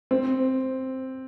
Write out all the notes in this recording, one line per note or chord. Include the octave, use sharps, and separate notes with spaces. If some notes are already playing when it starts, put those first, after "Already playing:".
C4